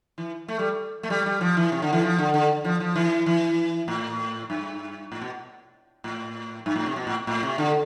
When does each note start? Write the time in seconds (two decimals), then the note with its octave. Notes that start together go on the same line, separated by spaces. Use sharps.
0.18 E3
0.48 A3
0.59 G3
1.03 A3
1.10 G3
1.26 G3
1.41 F3
1.57 E3
1.72 C3
1.82 D3
1.93 E3
2.03 F3
2.18 D3
2.34 D3
2.65 F3
2.80 F3
2.96 E3
3.26 E3
3.88 A2
4.50 G2
5.12 A2
5.21 B2
6.04 A2
6.66 G2
6.76 A2
6.86 C3
6.96 B2
7.07 A2
7.27 A2
7.43 C3
7.58 D3